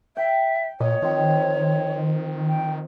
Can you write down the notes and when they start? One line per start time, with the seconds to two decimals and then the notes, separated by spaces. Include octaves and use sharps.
0.17 E5 G5
0.80 A#2 C#5 D#5
1.02 D#3 F3 C4
2.48 G5